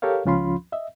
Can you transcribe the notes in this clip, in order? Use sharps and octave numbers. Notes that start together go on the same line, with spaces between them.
G4 A4 A#4 C#5 F5
C#2 F3 C#4 F4 B5 C6
D#5 E5